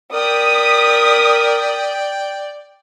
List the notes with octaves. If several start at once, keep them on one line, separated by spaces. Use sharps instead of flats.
A#4 D5 G5 D#6 B6